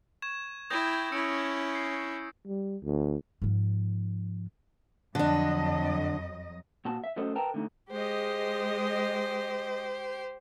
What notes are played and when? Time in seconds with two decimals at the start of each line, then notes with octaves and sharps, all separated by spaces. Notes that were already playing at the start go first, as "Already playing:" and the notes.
0.22 C#6 G#6 E7
0.70 E4 G5 D#6 G6 A#6
1.12 C#4 E4 E6 C#7 D7
1.75 C7
2.47 G3
2.83 D2
3.42 G#2 F3
5.15 F2 D3 F#3 D4 D#5
6.85 A#2 F#4 A5
7.04 E5
7.16 F#3 A3 C#4 A4 C5 D#5
7.35 A#4 B4 G5 A5 A#5
7.54 D3 A3 D#4
7.91 G#3 G4 C5 D#5